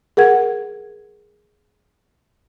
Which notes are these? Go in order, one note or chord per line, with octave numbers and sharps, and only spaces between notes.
G#4 A#4 F#5 G#6